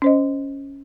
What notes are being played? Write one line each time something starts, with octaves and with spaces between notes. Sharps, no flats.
C#4 C5 D#5